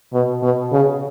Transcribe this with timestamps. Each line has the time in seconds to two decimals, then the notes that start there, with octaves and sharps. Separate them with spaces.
0.13 B2
0.42 B2
0.72 C#3